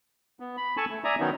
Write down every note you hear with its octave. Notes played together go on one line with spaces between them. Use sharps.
B3
B5
A4 G#5 A5 C#6
A3
D5 E5 G#5 A#5 D#6
D#3 F#3 B3 C#4 D#4